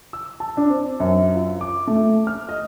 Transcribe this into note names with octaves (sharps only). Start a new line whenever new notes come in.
E6
A5
D4
C4
F#2
F4
D6
A3
F6
D#5